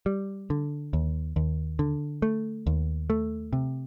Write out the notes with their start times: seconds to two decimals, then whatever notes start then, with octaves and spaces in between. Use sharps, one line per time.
0.06 G3
0.50 D3
0.93 D#2
1.36 D#2
1.79 D3
2.22 A3
2.67 D#2
3.10 A3
3.53 C3